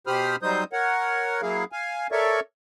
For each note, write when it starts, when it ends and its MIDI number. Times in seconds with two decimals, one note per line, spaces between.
0.07 0.36 47
0.07 0.36 67
0.07 0.36 72
0.07 0.36 83
0.07 0.36 87
0.07 0.36 89
0.43 0.64 54
0.43 0.64 55
0.43 0.64 63
0.43 0.64 72
0.43 0.64 87
0.43 0.64 91
0.73 1.41 70
0.73 1.41 73
0.73 1.41 78
1.42 1.64 54
1.42 1.64 58
1.42 1.64 64
1.42 1.64 68
1.42 1.64 77
1.72 2.07 77
1.72 2.07 80
2.12 2.40 69
2.12 2.40 70
2.12 2.40 73
2.12 2.40 74
2.12 2.40 76
2.12 2.40 85